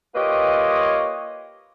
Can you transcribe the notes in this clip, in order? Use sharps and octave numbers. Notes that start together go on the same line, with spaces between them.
A#3 F4 G4 B4 C#5 D#5